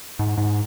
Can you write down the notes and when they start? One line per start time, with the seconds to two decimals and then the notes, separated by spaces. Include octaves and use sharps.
0.19 G#2
0.38 G#2